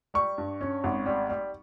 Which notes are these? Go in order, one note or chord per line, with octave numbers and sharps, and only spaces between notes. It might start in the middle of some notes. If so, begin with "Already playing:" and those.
G3 C#6
G2
C#4
G#1
G3
G3